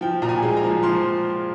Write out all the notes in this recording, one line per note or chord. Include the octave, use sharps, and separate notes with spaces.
F3 G5
A#2 A#5
G#5
G#3
A#5
F3
F3 C6